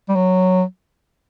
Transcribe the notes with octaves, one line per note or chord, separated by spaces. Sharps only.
G3
F#3